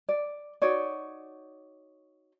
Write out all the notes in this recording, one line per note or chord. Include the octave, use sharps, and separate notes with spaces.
D5
D#4 F#4 C#5 D5